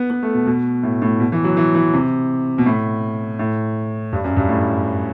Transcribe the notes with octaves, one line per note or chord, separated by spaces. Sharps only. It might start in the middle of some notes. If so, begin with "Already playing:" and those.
Already playing: B3
B3
A3
B2
B2
A2
A2
B2
E3
F#3
E3
E3
C3
B2
A2
A2
G2
F#2
G2
A2